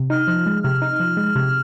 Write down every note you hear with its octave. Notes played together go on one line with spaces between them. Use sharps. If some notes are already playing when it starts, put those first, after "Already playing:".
Already playing: C3
D#4 F6
F3
G#3
C3 F6
D#4
F3
G#3
C3